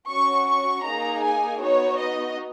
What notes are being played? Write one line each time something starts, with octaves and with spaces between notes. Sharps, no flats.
C#4 F#4 C#6
C#6
A#3 D#4 G#4 A#5
G#5
B3 D#4 F#4 C#5
D#5